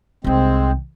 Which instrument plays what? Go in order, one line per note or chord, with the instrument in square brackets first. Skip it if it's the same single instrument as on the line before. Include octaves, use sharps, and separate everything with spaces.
[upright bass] C2 D#3 [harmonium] G#3 C4